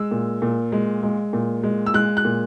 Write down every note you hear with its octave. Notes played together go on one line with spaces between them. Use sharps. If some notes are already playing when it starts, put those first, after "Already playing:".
Already playing: G#3 E6
A#2
A#2
G#3
G#3
A#2
G#3
E6
G#3 F#6
F#6
A#2